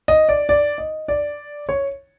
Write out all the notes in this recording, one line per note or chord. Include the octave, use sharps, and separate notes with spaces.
D#5
D5
D5
D#5
D5
C#5